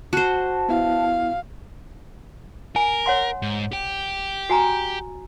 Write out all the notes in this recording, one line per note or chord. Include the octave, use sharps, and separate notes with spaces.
F#4 C5 A5
B3 E4 F5
A#4 G#5
C#5 F#5 C6
G#2
G4 G5
F#4 G#5 A#5